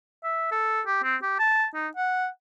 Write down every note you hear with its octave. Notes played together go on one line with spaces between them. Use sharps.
E5
A4
G4
C4
G4
A5
D#4
F#5